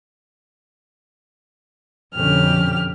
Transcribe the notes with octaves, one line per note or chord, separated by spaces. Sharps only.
F2 B2 D3 C#4 G4 F6